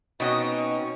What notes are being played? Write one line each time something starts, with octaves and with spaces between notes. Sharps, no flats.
B2 C4 C#4 D#4 F#4 D#5